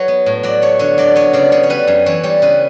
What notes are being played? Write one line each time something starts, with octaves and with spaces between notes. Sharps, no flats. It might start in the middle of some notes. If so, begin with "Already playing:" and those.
Already playing: F#3 A4 B4 C#5
B3
A2
F#3 D5
A3 C#5
D3 C#5
F#3 D5
B3 C#5
C#3 D5
C#3 C#5
C#5
G3 B4
F#2
E3 C#5
G3 C#5
C#3 B4